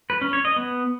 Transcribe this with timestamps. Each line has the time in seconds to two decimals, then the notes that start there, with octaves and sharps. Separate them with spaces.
0.10 B4
0.21 C#4
0.33 C#5
0.45 D#5
0.56 B3